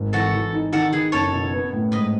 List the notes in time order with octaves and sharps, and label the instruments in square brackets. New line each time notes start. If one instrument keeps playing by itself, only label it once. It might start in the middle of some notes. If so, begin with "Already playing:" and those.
Already playing: [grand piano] G#1
[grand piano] E3 [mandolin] F#4 A4
[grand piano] E3
D#4
[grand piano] D#3 [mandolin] F#4 A4
[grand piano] D#3 [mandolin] G#4 B4
[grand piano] F#1 [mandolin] A4 C#5
[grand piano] B2
B3
A2
[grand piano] G#2 [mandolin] B4 D#5